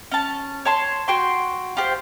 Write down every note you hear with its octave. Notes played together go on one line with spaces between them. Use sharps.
C#4 A5
C#5 A5 C6
F#4 G5 C6
F4 G4 C5